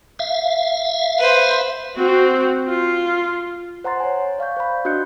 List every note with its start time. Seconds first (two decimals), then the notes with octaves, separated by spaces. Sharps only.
0.19 E5 F5
1.19 B4 C5
1.96 C4 F#4
2.69 F4
3.84 C5 F#5 A#5 C6 A6
4.00 C#5 G#5
4.39 D5 F5 C#6 G6
4.57 C5 B5
4.85 D4 F#4 D#5 F#6 G6 C#7